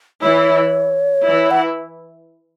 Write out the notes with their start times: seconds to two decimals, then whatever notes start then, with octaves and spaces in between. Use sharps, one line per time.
0.22 E3 E4 C#5
1.27 E3 E4
1.51 F#5